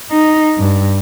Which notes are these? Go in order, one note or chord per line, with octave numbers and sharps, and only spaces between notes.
D#4
G2